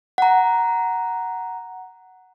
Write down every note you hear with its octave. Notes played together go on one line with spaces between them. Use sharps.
F#5 A#5